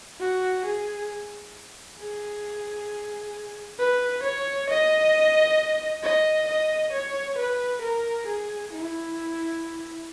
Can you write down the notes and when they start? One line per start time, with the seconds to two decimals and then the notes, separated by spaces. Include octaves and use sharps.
0.20 F#4
0.65 G#4
2.00 G#4
3.79 B4
4.23 C#5
4.69 D#5
6.03 D#5
6.48 D#5
6.93 C#5
7.38 B4
7.82 A#4
8.28 G#4
8.73 E4